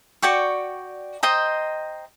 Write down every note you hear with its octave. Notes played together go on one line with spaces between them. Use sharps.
F#4 D5 G5 C#6
C5 D#5 G5 A#5